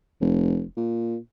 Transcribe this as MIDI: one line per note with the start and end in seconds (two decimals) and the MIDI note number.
0.21 0.64 29
0.77 1.17 46